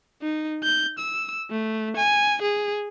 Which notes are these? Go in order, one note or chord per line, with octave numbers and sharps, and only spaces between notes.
D#4
G6
E6
A3
G#5
G#4